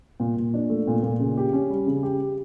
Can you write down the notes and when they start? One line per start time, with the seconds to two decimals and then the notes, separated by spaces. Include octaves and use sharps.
0.20 A#2
0.36 A#2
0.54 D4
0.70 A3
0.88 A#2
1.03 A#2
1.20 C#3
1.37 G4
1.53 C#4
1.70 G3
1.86 C#3
2.03 G4